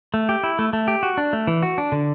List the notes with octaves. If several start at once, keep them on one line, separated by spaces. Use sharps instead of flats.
A3
G4
E4
A3
A3
G4
F#4
D4
A3
E3
F#4
D4
D3